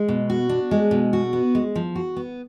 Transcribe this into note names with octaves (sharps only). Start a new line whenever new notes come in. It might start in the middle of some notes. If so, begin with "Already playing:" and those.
Already playing: G#3
B2
F#4
D4
G#3
B2
F#4
B3
G#3
F3
F#4
B3